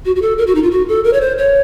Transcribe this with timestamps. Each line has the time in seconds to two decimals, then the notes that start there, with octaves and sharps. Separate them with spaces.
0.05 F#4
0.16 F#4
0.22 A4
0.38 A#4
0.47 F#4
0.55 D#4
0.63 F4
0.71 F#4
0.88 A4
1.04 A#4
1.13 C#5
1.21 C5
1.38 C#5